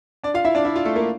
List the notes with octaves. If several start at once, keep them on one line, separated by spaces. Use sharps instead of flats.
D4 D5
F4 F5
E4 E5
D4 D5
E4
F4
A3 A4
A#3 A#4